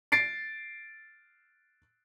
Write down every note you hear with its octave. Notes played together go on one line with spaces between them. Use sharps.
A6 C7 D7